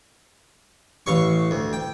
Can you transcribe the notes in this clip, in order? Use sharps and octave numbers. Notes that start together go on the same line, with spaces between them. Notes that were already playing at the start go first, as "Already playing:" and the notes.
A1 F5 C#6
D2
G5